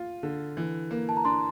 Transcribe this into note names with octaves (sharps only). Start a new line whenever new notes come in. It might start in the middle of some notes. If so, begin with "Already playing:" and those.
Already playing: F4
D3
E3
A#3
A5
A#5
D4 C6